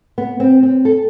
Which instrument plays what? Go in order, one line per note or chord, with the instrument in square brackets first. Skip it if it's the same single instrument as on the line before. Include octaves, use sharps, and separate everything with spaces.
[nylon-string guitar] B3
C4
C4
A4